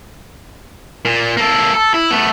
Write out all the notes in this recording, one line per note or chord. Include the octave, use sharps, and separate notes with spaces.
A#2
A#3 A4
A4
E4
A3 B3